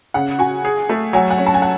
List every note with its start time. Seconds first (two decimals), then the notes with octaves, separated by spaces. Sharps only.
0.14 C#3 F#5
0.39 F#4 G#5
0.65 G#4
0.89 A3
1.13 F#3 G#5
1.30 F#5
1.38 C#4
1.46 A5
1.54 G#5
1.62 F#5